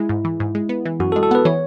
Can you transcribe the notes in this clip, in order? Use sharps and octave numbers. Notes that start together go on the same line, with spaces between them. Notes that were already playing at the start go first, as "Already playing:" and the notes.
Already playing: G#3 E4
G#2
E3
G#2
G#3
B3
E3
F#2 F#4
A4
G#3
A4
B3 B4
E3 C#5